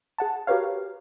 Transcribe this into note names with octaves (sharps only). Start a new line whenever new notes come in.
G#4 F#5 A5
F#4 G4 A#4 B4 C#5 F5